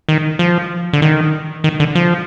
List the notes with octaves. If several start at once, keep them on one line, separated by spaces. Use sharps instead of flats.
D#3
F3
D3
D#3
D#3
D3
F3